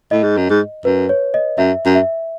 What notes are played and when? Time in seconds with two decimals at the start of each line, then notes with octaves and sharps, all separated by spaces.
0.11 A2 D#5
0.23 G#2
0.37 F#2
0.50 G#2
0.85 F#2 B4
1.09 C#5
1.34 D#5
1.58 F#2 E5
1.86 F#2
1.95 E5